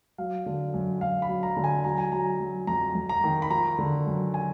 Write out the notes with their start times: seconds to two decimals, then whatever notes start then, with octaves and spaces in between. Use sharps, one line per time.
0.18 F#3 F5
0.46 D3
0.74 F#2
1.01 F#2 F5
1.22 B5
1.29 F#3
1.43 A#5
1.57 D3
1.64 G#5
1.84 F#3 A#5
1.98 G#5
2.12 F#3 A#5
2.40 F#3
2.67 F2 A#5
2.95 F2
3.09 A#5
3.24 D#3
3.42 B5
3.50 F3 A#5
3.78 D3
4.07 F#2
4.34 G#5